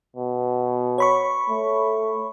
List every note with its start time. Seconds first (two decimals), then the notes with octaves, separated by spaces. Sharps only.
0.16 B2
0.98 C#5 B5 C#6
1.50 A3